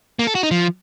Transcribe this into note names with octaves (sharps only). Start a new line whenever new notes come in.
A#3
A4
F#4
D#4
F3